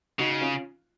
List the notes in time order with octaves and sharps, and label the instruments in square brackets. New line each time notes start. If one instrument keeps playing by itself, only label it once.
[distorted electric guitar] C#3 [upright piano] D#4 F#4
[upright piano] D#4
C#4 F4